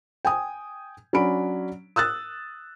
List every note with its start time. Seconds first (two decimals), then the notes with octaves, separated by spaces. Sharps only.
0.25 G5 G#5 D#6
1.13 F#3 C#4 D4 B5 D7
1.96 D#6 E6 F#6 A6